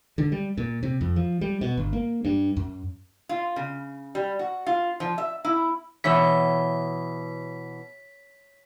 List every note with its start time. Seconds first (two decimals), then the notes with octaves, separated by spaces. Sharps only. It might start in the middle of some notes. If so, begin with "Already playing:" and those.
0.18 D3
0.32 G3
0.57 A#2
0.83 C3
1.01 F2
1.16 F3
1.41 G3
1.61 B2
1.77 G1
1.93 A#3
2.25 G2
2.57 F#2
3.29 F4
3.56 C#3
4.15 G3
4.39 F#4
4.66 F4
5.00 F3
5.18 E5
5.45 E4
6.04 B2 E3 C#5 E5 B6